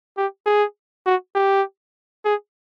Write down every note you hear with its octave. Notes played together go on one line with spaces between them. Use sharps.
G4
G#4
F#4
G4
G#4